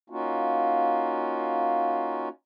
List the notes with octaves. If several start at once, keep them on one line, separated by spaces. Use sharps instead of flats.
A#3 C#4 D#4 F4 F#4